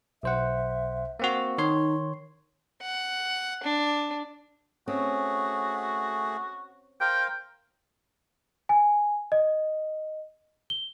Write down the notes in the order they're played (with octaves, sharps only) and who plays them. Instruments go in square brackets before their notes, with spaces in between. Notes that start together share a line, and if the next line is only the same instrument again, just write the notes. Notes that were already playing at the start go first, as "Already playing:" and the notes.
[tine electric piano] B1 C5 F#5 [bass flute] E5
[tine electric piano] A#3 C4 F#4
[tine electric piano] D#3 C#5 C6 [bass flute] D#4
[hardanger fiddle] F#5
D4
[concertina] A3 G#4 [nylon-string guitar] C4 C#4 [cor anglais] F#4
[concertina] A#4 C5 F5 [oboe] G5
[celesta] G#5
D#5
G7